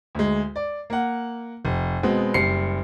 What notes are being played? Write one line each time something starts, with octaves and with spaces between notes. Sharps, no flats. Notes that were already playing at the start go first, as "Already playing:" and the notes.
D2 G#3
D5
A#3 F#5
F1
B2 G#3 B3 C4
F#1 G3 C7 C#7